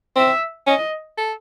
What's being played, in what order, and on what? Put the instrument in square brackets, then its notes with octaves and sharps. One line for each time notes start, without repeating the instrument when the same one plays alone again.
[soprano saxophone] C4 [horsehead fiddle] E5
[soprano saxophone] C#4 [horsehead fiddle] D#5
[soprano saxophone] A4